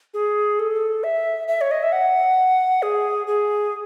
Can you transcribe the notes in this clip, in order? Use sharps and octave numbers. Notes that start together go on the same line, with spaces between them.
G#4
A4
E5
E5
C#5
D#5
E5
F#5
G#4
G#4